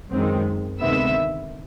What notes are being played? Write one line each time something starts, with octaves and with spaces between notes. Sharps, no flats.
F#2 D#3 G#3 C4
D2 C3 D#3 G#3 B3 E5